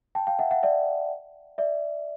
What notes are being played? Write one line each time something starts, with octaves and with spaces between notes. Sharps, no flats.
G5 A5
F5 G5
E5 F#5
E5 F#5
D5 E5
D5 E5